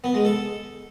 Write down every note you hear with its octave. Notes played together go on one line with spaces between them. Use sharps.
B3
G#3
A4